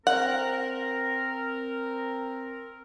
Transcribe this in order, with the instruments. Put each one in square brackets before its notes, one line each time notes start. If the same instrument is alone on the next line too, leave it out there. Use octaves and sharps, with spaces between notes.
[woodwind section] C4 A#4 [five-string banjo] F#5